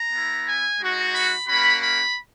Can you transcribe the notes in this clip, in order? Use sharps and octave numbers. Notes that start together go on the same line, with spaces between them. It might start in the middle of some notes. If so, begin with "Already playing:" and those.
Already playing: A#5
B3 E4
G#5
G#3 D#4 F#4
B5
A#3 C#4 F#4 B5
B5